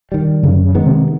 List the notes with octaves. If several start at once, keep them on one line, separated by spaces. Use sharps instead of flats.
D#3 G3
F#2 C#3
C#3
D#3 G#3 B3
C3